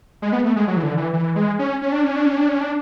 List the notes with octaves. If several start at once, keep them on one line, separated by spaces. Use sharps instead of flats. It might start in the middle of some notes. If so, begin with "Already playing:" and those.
G#3
B3
A3
G#3
F#3
E3
D3
E3
E3
G#3
C#4
C#4
D4
C#4
D4
C#4
D4
C#4
D4